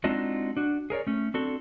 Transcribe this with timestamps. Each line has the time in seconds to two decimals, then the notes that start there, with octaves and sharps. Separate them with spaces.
0.04 G#3 C4 D4 D#4 F4 F#4
0.57 D4 F#4
0.90 G#4 A#4 C#5 D5
1.07 A3 C#4
1.34 C4 D4 F#4 A4